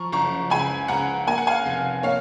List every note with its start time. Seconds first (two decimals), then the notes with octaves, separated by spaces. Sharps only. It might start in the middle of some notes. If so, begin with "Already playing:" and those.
Already playing: F3 A#5 C#6
0.12 F#1 A#5 C#6
0.50 C#2 G#5 B5
0.88 C#2 F#5 A#5
1.27 A#3 G#5
1.38 F#5
1.47 F5 G#5
1.65 F1
2.03 A#3 C#5 F5